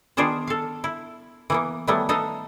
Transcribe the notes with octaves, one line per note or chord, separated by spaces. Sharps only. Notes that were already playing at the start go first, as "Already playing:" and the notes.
D#3 B3 D4 F4 G#4 C5
A4 F5
E4
E3 A#3 B3
D#3 E3 F#3 G3 A3 B3
B3 D#4 A4 D#5 F5